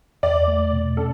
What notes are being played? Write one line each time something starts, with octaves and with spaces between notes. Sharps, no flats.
E2 D5
A3
B2
C#4 A4